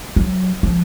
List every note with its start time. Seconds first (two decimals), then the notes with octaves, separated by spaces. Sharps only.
0.16 F#3
0.63 F3